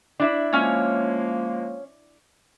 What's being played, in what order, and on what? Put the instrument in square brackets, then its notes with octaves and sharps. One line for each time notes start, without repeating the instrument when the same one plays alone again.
[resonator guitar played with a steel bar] D4 E4 E5
[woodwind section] F3 G#3 A#3 [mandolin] C#4 C#5